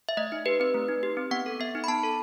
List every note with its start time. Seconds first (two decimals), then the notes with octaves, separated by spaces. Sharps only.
0.09 E5
0.17 A3 D#5
0.32 D#4
0.46 G4 B4
0.60 C4 B4
0.74 A3
0.88 D#4
1.03 G4
1.17 C4
1.31 B3 F#5
1.46 A4
1.60 B3 E5
1.75 D#4
1.84 B5
1.88 B3 A5
2.03 A4